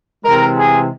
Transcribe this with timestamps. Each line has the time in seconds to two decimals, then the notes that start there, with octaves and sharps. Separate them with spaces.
0.24 C3 E3 G#3 A#4
0.56 G#4